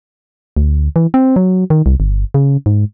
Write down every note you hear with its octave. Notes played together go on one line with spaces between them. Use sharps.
D2
E3
C4
F#3
D#3
C2
G1
C#3
G#2